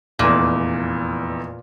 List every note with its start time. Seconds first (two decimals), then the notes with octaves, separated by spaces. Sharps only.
0.19 F1 E2 A#2